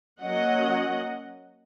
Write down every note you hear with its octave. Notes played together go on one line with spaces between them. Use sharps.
F#3 A#3 C#4 D#5 F#5